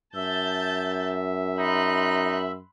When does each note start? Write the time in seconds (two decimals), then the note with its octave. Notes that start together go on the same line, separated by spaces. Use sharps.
0.15 F#2 E5 A5 G6 A6
1.59 D#4 B5 C6 F#6